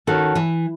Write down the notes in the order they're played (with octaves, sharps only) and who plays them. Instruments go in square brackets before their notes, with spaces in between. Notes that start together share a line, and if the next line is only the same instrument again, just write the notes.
[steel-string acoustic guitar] D#3 [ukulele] C#4 F#4 A4
[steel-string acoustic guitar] E3